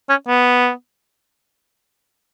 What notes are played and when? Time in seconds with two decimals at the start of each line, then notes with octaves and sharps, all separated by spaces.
0.09 C#4
0.27 B3